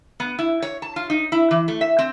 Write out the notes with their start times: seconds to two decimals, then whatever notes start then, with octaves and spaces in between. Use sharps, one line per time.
0.20 B3
0.39 E4
0.62 C#5
0.82 A5
0.96 F4
1.10 D#4
1.32 E4
1.51 E3
1.68 A3
1.81 E5
1.99 C4